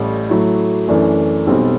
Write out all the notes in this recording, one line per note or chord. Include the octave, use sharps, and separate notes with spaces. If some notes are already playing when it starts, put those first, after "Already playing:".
Already playing: A1 A2 G3
A2 F#3 A3 E4
F#2 E3 A3 D4
B1 B2 G3 C4